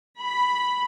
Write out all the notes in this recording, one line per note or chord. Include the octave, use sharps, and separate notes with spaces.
B5